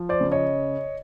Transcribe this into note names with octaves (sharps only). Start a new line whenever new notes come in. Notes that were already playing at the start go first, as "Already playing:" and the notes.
Already playing: F3
C5 D5
C#3
C#5 D#5